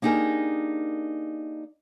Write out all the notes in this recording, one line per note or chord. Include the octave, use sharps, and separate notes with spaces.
A#3 D4 D#4 G4 G#4 A#4